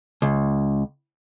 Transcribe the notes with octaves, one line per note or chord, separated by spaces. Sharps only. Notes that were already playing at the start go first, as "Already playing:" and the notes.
C#2